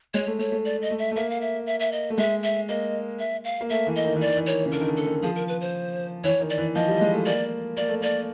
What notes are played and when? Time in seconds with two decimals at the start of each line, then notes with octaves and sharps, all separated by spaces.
0.14 G#3 C#5
0.27 A3
0.39 A3 C#5
0.52 A3
0.65 D5
0.82 D#5
0.91 A3
0.99 E5
1.11 A3
1.16 A#3 E5
1.30 F5
1.41 E5
1.66 E5
1.80 E5
1.92 D#5
2.10 A3
2.17 G#3 E5
2.43 E5
2.68 A#3 D#5
3.19 E5
3.44 F5
3.61 A#3
3.69 A3 E5
3.87 E3
3.96 D#5
4.04 D#3
4.16 E3
4.21 D5
4.27 D#3
4.37 E3
4.46 D#3 C#5
4.66 C#3
4.72 D3 A#4
4.81 D#3
4.88 D3
4.97 A4
5.06 D#3
5.23 F3 G#4
5.35 A#4
5.48 B4
5.61 C5
6.24 E3 C#5
6.41 D#3
6.50 D5
6.58 E3
6.75 F3 D#5
6.88 G3
7.01 G#3
7.13 A3
7.26 A#3 D5
7.77 A#3 D5
7.88 A3
8.01 A#3 D5